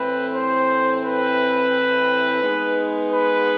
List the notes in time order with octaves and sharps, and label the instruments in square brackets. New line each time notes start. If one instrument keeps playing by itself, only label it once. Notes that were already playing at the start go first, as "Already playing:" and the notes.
Already playing: [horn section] A2 E3 A3 C4 [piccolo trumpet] B4
[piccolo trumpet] C5
B4
[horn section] G#3 B3 D#4
[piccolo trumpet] B4